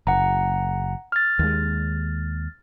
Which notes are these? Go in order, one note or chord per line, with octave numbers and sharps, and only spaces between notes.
F#1 F#5 A#5
F6 A6
D#2 G#3